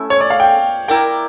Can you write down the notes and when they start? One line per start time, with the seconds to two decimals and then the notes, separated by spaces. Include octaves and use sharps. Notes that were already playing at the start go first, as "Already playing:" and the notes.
Already playing: A3 C#4 E4
0.10 C#5
0.21 D5
0.30 F5
0.40 G5
0.88 E4 A#4 D5 G5